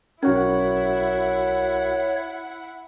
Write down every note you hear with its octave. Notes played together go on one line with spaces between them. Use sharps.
B1 C#4 E4 F#4 A#4 C#5 F#5